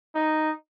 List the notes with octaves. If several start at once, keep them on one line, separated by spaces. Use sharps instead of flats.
D#4